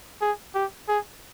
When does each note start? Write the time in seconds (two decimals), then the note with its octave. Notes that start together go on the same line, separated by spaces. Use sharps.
0.21 G#4
0.55 G4
0.88 G#4